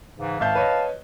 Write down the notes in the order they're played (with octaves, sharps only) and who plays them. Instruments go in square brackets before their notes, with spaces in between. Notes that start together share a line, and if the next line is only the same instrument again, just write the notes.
[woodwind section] G#2 C#3 E3
[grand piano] G#1 E5 G6 [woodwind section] F5 A5
[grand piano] B4 C#5 D#5